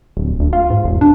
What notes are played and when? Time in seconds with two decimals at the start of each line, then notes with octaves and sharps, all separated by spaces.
0.17 D1
0.40 D2
0.53 F4
0.70 G#2
0.84 E1
1.01 D4